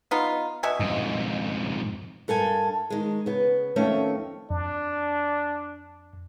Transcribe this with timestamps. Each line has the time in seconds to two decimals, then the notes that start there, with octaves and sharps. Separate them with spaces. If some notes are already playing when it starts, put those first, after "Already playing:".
0.11 B3 D#4 F4
0.63 B2 E5 G#5
0.80 F2 G#2
2.28 G2 A4 A#4 G#5
2.90 D#3 G#3
3.26 C#3 B3
3.76 F2 D#3 A3 C#4 E5
4.50 F2 D4